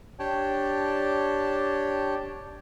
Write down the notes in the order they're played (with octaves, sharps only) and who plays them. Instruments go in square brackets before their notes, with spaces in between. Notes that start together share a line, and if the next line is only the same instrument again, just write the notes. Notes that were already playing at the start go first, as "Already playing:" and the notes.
[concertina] D4 G4 C#5 D5 G5 A5